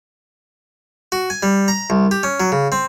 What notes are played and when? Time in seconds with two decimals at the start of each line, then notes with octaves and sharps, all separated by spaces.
1.12 F#4
1.30 G#5
1.43 G3
1.68 A#5
1.90 C2
2.11 G4
2.23 C#4
2.40 F#3
2.52 C#3
2.72 C4